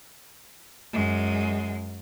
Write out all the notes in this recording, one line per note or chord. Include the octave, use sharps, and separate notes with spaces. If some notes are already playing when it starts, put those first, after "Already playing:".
F#2 G#3